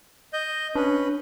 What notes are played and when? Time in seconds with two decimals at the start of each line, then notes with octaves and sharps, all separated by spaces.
0.33 D#5 G6
0.75 C#4 D4 B4